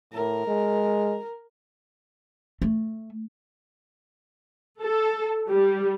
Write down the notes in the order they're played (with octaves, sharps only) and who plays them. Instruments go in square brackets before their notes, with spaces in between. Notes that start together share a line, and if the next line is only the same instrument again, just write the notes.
[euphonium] A2 [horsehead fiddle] A#4
[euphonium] G#3
[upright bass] A3
[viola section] A4
G3